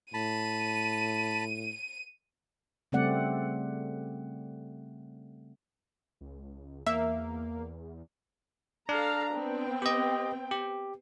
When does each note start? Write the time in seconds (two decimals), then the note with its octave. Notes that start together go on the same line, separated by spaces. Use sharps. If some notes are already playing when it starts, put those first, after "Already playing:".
0.14 A2 A5 B5 D#7
2.92 C#3 G3 A3 C4 D5 F#5
6.21 C#2
6.87 E2 A#3 E5
8.89 D4 A4 F5 A#5
9.34 B3 C4 G5
9.82 G4 D#5
10.51 G4